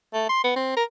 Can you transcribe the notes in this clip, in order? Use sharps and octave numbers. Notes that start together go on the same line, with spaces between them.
A3
C6
B3
C4
A#4